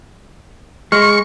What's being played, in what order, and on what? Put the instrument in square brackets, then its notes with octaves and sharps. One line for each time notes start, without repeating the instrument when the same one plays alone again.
[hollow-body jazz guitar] G#3 [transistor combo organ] C#6 [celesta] F6